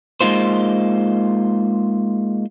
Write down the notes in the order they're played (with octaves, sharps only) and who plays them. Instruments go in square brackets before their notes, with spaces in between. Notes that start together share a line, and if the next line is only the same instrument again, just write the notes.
[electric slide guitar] G#3 A#3 D#4 F4 C5